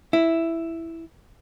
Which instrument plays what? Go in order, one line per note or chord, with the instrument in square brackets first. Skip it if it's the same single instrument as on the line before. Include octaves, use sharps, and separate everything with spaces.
[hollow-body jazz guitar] E4